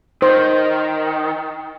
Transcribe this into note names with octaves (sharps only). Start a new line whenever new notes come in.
D#3 C5